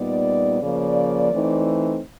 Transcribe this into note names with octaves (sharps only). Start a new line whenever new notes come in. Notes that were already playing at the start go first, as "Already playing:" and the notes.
Already playing: A#2 G3 B3 D#4 D5
C#3 F3 A#3 D5
E3 A3 C4 D#4